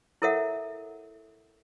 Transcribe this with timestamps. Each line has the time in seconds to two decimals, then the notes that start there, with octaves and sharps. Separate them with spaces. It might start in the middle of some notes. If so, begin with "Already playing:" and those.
0.22 E4 A4 A#4 C#5 E5 F#5